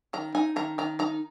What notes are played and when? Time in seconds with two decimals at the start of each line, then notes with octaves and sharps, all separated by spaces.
0.13 D#3 A#5
0.35 D#4 G#5
0.56 D#3 A#5
0.78 D#3 A#5
0.99 D#4 A#5